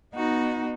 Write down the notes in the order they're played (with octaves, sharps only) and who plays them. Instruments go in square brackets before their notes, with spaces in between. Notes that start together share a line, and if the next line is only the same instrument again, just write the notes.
[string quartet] B3 D#4 F#4